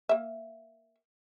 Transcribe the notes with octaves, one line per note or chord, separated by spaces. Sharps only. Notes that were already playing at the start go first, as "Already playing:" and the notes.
A#3 E5